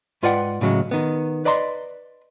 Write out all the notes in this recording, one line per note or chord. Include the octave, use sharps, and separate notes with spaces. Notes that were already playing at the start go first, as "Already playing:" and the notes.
G#2 F4 B4 D5 F#5 G5
A2 C#3 F#3 G#3
D#3 B3
B4 D5 D#5 A#5 C6